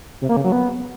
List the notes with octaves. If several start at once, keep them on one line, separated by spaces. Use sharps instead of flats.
C3
A#3
C#3
F#3
B3